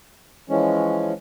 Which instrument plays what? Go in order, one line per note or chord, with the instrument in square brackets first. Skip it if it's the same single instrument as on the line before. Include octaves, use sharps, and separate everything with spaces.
[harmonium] E3 F3 G#3 C#4